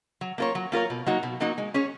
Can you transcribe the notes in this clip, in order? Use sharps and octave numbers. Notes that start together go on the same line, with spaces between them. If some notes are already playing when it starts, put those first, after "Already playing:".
F#3
A#3 F4 A#4 C#5
F#3
A#3 F4 A#4 C#5
B2
F#3 A#3 D#4 F#4
B2
F#3 A#3 D#4 F#4
G#3
C#4 G#4 C#5